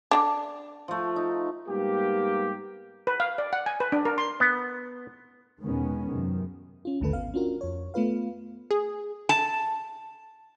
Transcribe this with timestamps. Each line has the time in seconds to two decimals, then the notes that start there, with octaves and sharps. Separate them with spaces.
0.11 D3 C#4 D4
0.88 F3 A3
1.16 D#4
1.68 G#2 G3 A#3 B3 G4
3.07 B4
3.20 F5
3.38 D5
3.53 F#5
3.66 G#5
3.80 B4
3.92 D4
4.05 A#4
4.18 C6
4.40 B3
5.62 E2 B2 D#3 G#3 B3 C#4
6.10 F#2 C3 D#3
6.85 C#4 F4
7.00 A1 D#2 D3 A3 A4 B4
7.13 G#1 B3 F5
7.34 C#4 D4 F4 F#4 A#4
7.61 F2 C#5
7.94 A3 B3 F4 B4 F5
8.71 G#4
9.29 A5